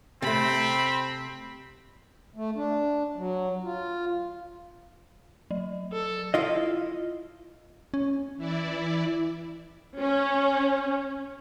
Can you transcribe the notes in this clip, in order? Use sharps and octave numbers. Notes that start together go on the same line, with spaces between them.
C3 A3 C4 B5
A3
D4
F#3
F4
F#3
A4
E4 F4 D#5
C#4
E3 E4 D5
C#4